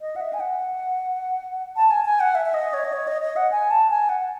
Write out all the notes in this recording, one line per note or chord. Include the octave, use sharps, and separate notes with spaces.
D#5
F#5
E5
G#5
F#5
A5
G#5
G#5
F#5
E5
E5
D#5
C#5
D#5
C#5
D#5
D#5
F#5
G#5
A5
G#5
F#5